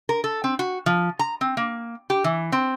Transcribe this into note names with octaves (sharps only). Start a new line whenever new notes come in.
A#4
A4
C4
F#4
F3
A#5
C4
A#3
G4
E3
C4